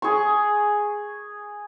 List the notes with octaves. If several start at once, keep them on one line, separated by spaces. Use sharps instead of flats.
G#4 C#6